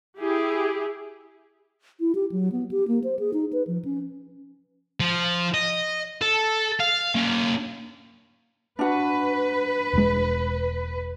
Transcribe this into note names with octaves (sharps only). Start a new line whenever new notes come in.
E4 G4 G#4
E4
G4
F#3
B3
G4
A#3
C5
G#4
D#4
B4
F3
C#4
F3
D#5
A4
F5
A#3 C#4
D4 F#4 B4
E1 G#3